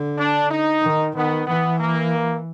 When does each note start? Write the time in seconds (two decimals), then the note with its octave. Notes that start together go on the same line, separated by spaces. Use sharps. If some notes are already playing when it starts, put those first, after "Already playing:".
Already playing: D3
0.18 D4
0.50 D#4
0.83 D#3
1.15 D#3 B3
1.47 E3 B3
1.80 A#3